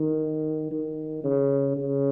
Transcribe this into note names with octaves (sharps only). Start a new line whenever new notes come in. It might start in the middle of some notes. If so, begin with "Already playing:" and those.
Already playing: D#3
D#3
C#3
C#3